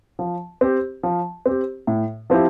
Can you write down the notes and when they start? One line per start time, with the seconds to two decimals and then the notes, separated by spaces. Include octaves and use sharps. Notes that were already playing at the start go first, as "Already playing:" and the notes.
0.19 F3
0.61 C4 G4
1.03 F3
1.46 C4 G4
1.87 A2
2.30 F3 C4 E4 G4